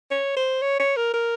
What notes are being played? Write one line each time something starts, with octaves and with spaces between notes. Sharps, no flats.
C#5
C5
C#5
C#5
A#4
A#4